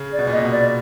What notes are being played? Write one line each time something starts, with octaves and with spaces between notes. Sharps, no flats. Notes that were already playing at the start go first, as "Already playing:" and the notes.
Already playing: C#3
D5
B2
A#2
B2 D#5
B2
D5